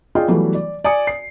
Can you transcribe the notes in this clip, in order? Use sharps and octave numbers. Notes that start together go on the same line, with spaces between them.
F4 G#4 D5 D#5 G5
E3 F#3 G3 A3 B3
D5
D5 G#5 D#6 C#7
C7